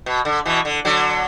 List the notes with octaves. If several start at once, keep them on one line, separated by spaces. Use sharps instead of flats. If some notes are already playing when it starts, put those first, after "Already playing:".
B2
D3
B2 E3
D3
D3 F#3